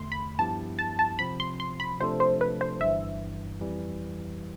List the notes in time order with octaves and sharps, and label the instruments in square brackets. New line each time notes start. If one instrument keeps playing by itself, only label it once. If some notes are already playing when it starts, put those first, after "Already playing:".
Already playing: [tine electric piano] E2 D3 A3 [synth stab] C6
[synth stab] B5
[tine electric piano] G2 F3 B3 E4 G4 [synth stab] A5
[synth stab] A5
A5
[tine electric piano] C3 F3 C4 [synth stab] B5
[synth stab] C6
C6
B5
[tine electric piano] C3 F3 A3 D4 A4 [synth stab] C5
[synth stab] C5
B4
C5
[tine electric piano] G1 G2 E3 [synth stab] E5
[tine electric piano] F2 E3 G3